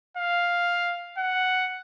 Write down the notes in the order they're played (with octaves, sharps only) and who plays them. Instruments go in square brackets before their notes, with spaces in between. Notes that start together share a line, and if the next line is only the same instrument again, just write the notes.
[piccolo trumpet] F5
F#5